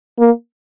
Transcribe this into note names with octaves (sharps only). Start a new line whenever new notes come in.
A#3